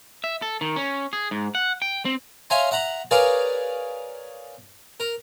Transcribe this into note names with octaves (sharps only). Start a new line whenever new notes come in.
E5
A4
D#3
C#4
G#4
G#2
F#5
G5
C4
C#5 E5 F5 G#5 A#5 C6
E5 F#5 A#5 B5
G#4 A#4 B4 C#5 D5 F5
A#4